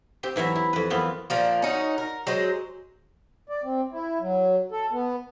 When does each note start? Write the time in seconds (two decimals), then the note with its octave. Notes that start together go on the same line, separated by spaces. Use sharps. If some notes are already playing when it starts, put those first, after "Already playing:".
0.23 C4 G4
0.36 E2 E3 F#3 E5 A#5
0.56 E4
0.73 F2 B4
0.90 F#2 E3 B3 C4 F4
1.30 A#2 F3 A#3
1.62 C#4 D#4 F#4
1.98 A#4
2.27 F#3 G#3 C5
3.49 D5
3.64 C4
3.92 E4
4.20 F#3
4.71 A4
4.92 B3